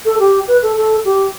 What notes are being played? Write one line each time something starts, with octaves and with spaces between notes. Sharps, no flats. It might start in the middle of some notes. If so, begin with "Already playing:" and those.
A4
G4
B4
A4
A4
G4